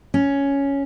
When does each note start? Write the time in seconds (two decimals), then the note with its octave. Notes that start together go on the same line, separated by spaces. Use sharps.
0.14 C#4